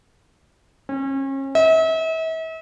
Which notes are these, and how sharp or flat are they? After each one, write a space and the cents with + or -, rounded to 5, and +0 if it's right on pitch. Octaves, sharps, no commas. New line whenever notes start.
C#4 -35
E5 -40